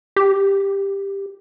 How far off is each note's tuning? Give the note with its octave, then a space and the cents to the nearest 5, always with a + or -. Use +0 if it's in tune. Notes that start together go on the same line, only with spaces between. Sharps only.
G4 +10